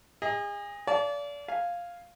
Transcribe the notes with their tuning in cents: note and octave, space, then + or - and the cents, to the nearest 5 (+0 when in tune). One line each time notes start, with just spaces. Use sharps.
G#4 -35 D#5 +10
D5 -30 F5 -25 A5 -35
F5 +0 G#5 +0